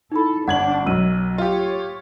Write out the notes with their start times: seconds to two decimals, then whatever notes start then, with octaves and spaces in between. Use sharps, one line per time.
0.12 D#4 E4 A4 B5
0.48 G1 D4 F#5 G#6 F#7
0.87 B1 F#2 E6 D#7
1.38 F4 G4 C#5